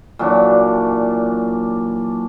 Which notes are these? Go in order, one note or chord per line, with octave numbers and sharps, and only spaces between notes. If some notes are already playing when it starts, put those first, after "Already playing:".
A#2 E3 F#3 D4